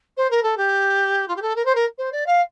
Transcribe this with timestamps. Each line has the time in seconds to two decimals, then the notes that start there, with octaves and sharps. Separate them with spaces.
0.17 C5
0.31 A#4
0.43 A4
0.57 G4
1.28 F4
1.36 G4
1.42 A4
1.56 A#4
1.65 C5
1.75 A#4
1.98 C5
2.12 D5
2.26 F5